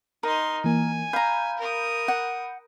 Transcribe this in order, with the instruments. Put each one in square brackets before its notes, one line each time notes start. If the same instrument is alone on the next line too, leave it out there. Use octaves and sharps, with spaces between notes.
[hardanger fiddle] D#4 C6 [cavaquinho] A#4
[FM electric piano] E3 A#3 [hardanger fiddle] G#5
[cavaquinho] F5 A#5 [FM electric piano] B5 G6
[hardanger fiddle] A#4 D#6
[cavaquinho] F#5